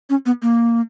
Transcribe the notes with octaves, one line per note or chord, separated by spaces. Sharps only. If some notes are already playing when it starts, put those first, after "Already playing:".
C#4
B3
A#3